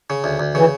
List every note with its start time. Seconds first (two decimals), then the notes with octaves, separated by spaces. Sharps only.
0.10 C#3
0.24 D2
0.39 D2
0.55 C#3 E3